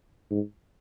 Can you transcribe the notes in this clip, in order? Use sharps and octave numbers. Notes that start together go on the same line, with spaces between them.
G#2